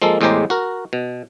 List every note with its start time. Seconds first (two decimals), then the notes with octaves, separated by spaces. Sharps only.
0.02 F3 G#3 A#3 A4
0.21 E2 A2 G#3 G4 C5 A#5
0.50 F#4 A#4
0.93 B2